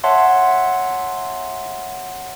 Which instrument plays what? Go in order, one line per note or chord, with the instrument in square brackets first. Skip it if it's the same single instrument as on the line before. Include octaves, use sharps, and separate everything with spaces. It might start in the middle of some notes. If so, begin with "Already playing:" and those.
[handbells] C#5 E5 F#5 A5 C6